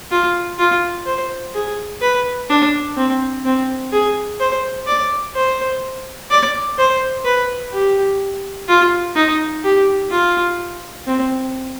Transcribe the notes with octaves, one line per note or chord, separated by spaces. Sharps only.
F4
F4
C5
G#4
B4
D4
C4
C4
G#4
C5
D5
C5
D5
C5
B4
G4
F4
D#4
G4
F4
C4